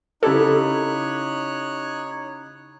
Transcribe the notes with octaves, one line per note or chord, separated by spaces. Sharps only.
C#3 D#4 E4 G4 A4 C#5 F#6